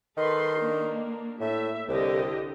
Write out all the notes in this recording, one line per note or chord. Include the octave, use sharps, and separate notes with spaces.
D#3 A4 B4 C6
A#3 D4
A2 E5
C2 D3 G4 D#5